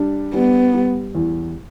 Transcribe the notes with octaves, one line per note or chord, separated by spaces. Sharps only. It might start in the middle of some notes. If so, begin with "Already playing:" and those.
Already playing: G3 D4
G3 B3
G3
E2